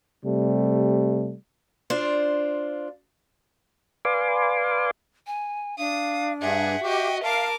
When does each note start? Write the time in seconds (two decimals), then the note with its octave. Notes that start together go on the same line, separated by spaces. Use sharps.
0.23 C3 G3 A3
1.90 D4 F4 C5
4.05 B4 D5 F5 G#5 C6 D6
5.27 G#5
5.78 D4 F5 D#6
6.42 G2 G#4 E5 F#5
6.84 F#4 G4 D#5 G5
7.24 A#4 F5 A5 D6